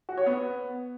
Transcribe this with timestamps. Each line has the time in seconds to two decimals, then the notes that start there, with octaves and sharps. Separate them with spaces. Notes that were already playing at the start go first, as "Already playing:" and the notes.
0.09 F#4
0.18 C#5
0.26 B3